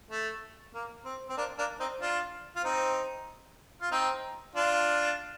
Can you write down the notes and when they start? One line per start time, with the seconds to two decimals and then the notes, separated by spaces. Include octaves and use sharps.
0.10 A3
0.74 A#3
1.05 C4
1.29 C4
1.37 A#3 D4
1.58 A#3 D4
1.80 C4 D#4
2.00 D4 F4
2.56 F4
2.64 C4 D#4
3.81 F4
3.91 C4 D#4
4.55 D4 F4